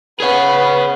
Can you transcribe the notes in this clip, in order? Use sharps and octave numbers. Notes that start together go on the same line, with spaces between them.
B3 G#4 C#5